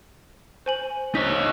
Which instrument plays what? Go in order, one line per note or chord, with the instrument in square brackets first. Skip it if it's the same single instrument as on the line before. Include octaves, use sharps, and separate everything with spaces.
[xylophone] C5 G#5 F#7
[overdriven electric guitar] D#4 C#5 [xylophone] B6